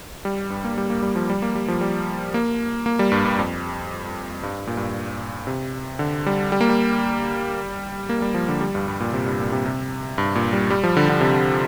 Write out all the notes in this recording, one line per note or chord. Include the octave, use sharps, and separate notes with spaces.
G3
G2
A#3
G3
A#3
G3
F3
G3
A#3
G3
F3
G3
A#3
A#3
G3
G2
G2
F2
G2
A#2
G2
C3
D3
G3
G3
A#3
G3
A#3
G3
F3
D3
G3
G2
G2
A#2
C3
G2
A#2
C3
C3
G2
A#2
G3
G3
F3
D3
D3
C3
D3